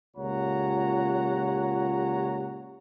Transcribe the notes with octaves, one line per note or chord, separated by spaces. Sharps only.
C#2 A#2 G4 C#5 F#5 A#5